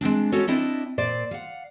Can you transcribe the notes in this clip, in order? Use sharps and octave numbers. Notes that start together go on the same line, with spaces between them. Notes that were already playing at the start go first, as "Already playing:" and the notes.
G#3 A#3 C4 D4
G#3 C#4 F#4 G4 A4 C#5
C4 D4 E4 D5 D#5 A5
A#2 C5 D5
F5 F#5